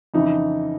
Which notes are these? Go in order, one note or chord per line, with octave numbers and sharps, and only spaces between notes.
F2 C#3 E3 D#4